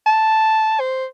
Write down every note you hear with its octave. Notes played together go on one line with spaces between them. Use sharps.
A5
C5